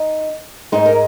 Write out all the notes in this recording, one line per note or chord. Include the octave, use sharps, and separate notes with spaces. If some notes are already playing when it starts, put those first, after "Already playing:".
Already playing: D#4
G#2 G#3 D#4
A#4